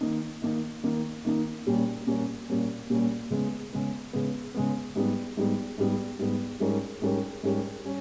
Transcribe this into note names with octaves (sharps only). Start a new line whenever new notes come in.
D#3 A#3 D#4
D#3 A#3 D#4
D#3 A#3 D#4
D#3 A#3 D#4
A#2 G3 A#3 C#4
A#2 G3 A#3 C#4
A#2 G3 A#3 C#4
A#2 G3 A#3 C#4
C#3 G#3 B3
C#3 G#3 B3
C#3 G#3 B3
C#3 G#3 B3
G#2 G3 B3
G#2 G3 B3
G#2 G3 B3
G#2 G3 B3
G#2 G3 C#4 G4 A#4
G#2 G3 C#4 G4 A#4
G#2 G3 C#4 G4 A#4
G3 C#4